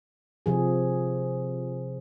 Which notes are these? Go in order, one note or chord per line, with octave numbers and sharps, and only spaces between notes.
C3 F3 G#4